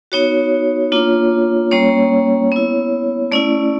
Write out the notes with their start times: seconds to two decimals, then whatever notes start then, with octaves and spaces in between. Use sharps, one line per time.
0.12 B3 D#4 F#4 C#5
0.92 A#3 D4 F4
1.71 G3 A#3 C#4 C#5
2.52 B3 E4
3.32 A3 C#4 E4 D5